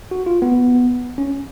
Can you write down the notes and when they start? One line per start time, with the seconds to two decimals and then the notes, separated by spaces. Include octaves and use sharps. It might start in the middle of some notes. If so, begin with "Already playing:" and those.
0.11 F#4
0.26 F4
0.42 B3
1.18 C#4